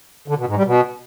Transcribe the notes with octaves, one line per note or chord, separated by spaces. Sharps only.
D3
B2
G#2
G3
B2